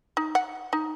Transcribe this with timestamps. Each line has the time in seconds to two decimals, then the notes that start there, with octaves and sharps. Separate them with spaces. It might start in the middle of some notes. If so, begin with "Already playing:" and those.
0.17 D#4
0.35 F#5
0.73 D#4